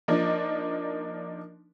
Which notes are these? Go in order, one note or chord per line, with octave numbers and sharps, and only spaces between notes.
F3 A#3 D4 D#4